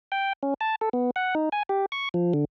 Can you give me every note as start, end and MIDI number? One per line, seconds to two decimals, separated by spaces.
0.12 0.33 79
0.43 0.54 61
0.61 0.75 81
0.81 0.89 69
0.93 1.11 59
1.16 1.35 78
1.35 1.49 63
1.52 1.63 80
1.69 1.86 67
1.92 2.09 85
2.14 2.33 53
2.34 2.45 50